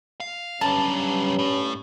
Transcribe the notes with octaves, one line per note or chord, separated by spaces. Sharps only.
F5
G2 F#3 G3 C#4 A5
A2